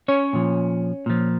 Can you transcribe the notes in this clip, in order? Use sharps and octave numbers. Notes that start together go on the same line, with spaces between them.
C#4 C#5
A#2 F3
A#2 F3